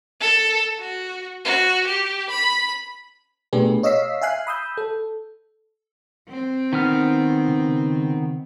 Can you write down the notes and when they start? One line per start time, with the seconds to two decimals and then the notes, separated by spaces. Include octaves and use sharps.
0.21 A4
0.80 F#4
1.45 F#4
1.87 G4
2.30 B5
3.53 B2 A3 D4 G4 G#4 B4
3.83 C#5 D#5 F5 E6 B6 C7
4.21 E5 F5 G#5 F#6 C7
4.47 B5 D#6 E6 G6
4.77 A4
6.29 C4
6.73 D#3 B3 F6
7.48 C#3